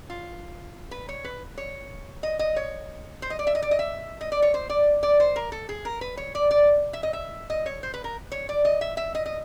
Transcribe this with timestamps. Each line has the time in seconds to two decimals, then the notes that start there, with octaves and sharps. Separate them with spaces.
0.10 F4
0.91 B4
1.09 C#5
1.25 B4
1.58 C#5
2.23 D#5
2.39 D#5
2.56 C#5
3.22 C5
3.30 D#5
3.39 D5
3.47 E5
3.55 D#5
3.62 D5
3.71 D#5
3.79 E5
4.21 D#5
4.32 D5
4.42 C#5
4.54 C5
4.70 D5
5.03 D5
5.20 C5
5.36 A#4
5.52 A4
5.69 G#4
5.85 A#4
6.01 B4
6.17 C#5
6.35 D5
6.51 D5
6.93 E5
7.03 D#5
7.13 E5
7.50 D#5
7.66 C#5
7.83 C5
7.94 B4
8.04 A#4
8.32 C#5
8.49 D5
8.65 D#5
8.81 E5
8.97 E5
9.15 D#5
9.26 D#5